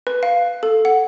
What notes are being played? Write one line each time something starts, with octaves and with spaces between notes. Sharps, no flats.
B4
F5
A4
F#5